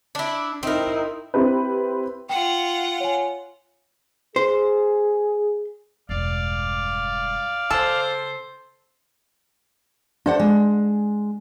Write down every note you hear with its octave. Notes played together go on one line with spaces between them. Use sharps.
D4 E4
C4 D#4 E4 A#4
C4 E4 G4 B4
F4 F#5 G5
C#5 G#5
G#4 C5
E1 G2 D5 F5
C#3 A4 C5
D4 A4 C5 F#5
G#3